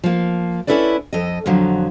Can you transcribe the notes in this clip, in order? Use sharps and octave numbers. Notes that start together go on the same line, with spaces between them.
F3 A#3
C#4 D4 E4 A4 B4 D5
F2 A4 D#5
F2 D3 F3 F#3